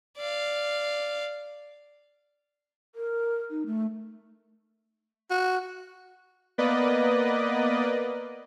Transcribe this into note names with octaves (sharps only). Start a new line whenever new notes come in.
D5 F5
A#4
D#4
A3
F#4
A#3 B3 B4 D5 D#5